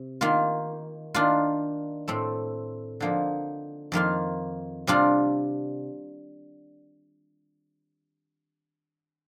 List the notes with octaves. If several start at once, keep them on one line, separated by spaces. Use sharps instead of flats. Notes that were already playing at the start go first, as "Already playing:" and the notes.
Already playing: C3
D#3 A#3 F4
D#3 A#3 D4 F4
A2 A3 C4
D3 F3 A#3 D#4
F2 D#3 A#3 F4
C3 G3 D4 F4